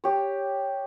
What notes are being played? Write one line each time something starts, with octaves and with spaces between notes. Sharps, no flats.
G4 C#5